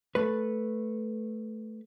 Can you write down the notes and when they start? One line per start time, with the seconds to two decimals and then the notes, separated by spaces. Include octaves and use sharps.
0.15 A3 B4